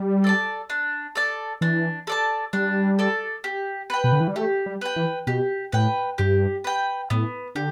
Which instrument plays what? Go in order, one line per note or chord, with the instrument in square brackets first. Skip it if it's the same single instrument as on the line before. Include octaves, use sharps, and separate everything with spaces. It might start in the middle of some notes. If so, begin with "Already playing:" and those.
Already playing: [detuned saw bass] G3
[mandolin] A4 D5 A5
D4
A4 D5 A5
[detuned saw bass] E3 [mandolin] D4
[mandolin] A4 D5 A5
[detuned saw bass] G3 [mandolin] D4
[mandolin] A4 D5 A5
G4
B4 G5
[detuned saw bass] B2
D3
E3
G3
[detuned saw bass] A3 [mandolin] G4
[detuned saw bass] G3
[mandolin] B4 G5
[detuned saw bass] E3
[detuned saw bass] B2 [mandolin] G4
[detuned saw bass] A2 [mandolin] B4 G5
[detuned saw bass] G2 [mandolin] G4
[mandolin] B4 G5
[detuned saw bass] A2 [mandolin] B3
[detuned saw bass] D3 [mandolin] G4